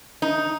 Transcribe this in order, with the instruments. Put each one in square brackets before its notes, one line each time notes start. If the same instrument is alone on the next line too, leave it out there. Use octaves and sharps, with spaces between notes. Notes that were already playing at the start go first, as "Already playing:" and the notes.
[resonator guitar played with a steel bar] D#4